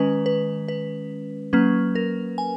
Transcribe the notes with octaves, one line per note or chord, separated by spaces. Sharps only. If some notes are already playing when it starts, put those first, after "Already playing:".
Already playing: D#3 G#3 C#4 B4
B4
B4
F#3 A#3 C#4 B4
A#4
G#5